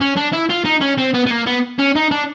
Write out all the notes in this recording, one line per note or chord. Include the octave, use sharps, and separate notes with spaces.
C#4
D4
E4
F4
D#4
C#4
C4
B3
B3
A#3
B3
C#4
D#4
D4